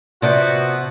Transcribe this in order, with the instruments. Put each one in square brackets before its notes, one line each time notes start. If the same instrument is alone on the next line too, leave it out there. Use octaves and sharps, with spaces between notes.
[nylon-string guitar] C3 D5 [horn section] F3 B3 F#4